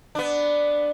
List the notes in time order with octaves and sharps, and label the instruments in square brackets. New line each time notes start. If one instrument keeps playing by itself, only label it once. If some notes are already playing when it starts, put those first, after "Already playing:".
[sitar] B3 D4